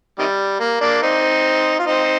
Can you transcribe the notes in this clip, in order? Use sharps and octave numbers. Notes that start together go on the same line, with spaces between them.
C3 D#3 G3
A#3
A#3 D4
C4 D#4
F4
C4 D#4